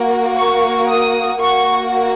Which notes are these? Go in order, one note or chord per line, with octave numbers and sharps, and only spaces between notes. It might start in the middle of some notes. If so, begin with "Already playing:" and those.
Already playing: A#3 F#4
C#6
D#6
A#3 F#4 C#6